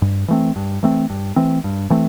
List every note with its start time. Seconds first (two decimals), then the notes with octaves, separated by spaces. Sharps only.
0.02 G2
0.28 E3 A3 C4
0.56 G2
0.83 E3 A3 C4
1.10 G2
1.36 E3 A3 C4
1.64 G2
1.90 E3 A3 C4